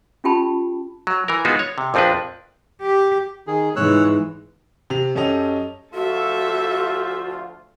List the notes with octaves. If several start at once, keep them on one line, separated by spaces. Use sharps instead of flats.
C#4 F4 G4 G5 A5 B5
F#3
E3 A#4
G#3 B3 D#4 F4 F#4
C#5
C3
A#1 F2 F3 C4 D4 B4
G4
D#3 G#4
G#2 E3 C#5 E6 F#6
C3 F7
F#2 C#4 G4 A4 D#5 F7
D2 F3 F4 F#4 A4 E5